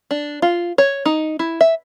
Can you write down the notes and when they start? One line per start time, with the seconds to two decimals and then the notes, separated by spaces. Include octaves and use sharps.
0.11 D4
0.42 F4
0.78 C#5
1.05 D#4
1.39 E4
1.61 E5